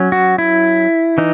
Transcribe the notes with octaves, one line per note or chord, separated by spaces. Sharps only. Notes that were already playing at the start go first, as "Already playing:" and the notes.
Already playing: F#3 C#4
F#4
E4
E3 D#4